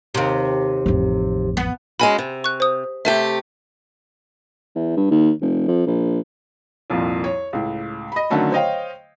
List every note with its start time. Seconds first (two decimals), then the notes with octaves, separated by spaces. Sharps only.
0.15 D#2 C3
0.86 A1 F2
1.57 B3
2.00 G#3 C#4 F#4 G#5 B5
2.18 C3
2.44 C#6 F#6
2.60 C5 D#6
3.05 C3 A3 G4 E5
4.75 E2
4.97 G2
5.11 D#2
5.41 F1
5.68 F2
5.86 A#1
6.90 C2 F2 A#2
7.24 C#5
7.53 C#2 A2
8.12 D#5 B5
8.30 D3 D#3 F#3 A3 C#4
8.52 C5 C#5 D#5 F5 G5